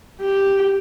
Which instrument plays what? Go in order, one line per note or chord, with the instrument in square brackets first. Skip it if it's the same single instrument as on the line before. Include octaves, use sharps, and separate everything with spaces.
[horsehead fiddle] G4